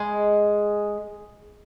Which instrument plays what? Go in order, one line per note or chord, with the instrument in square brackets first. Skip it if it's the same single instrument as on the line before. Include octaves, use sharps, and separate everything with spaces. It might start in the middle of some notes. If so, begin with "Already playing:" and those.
Already playing: [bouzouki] G#3